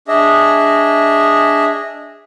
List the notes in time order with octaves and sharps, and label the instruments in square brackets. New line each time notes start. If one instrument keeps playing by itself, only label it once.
[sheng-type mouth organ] D4 G#4 D#5 E5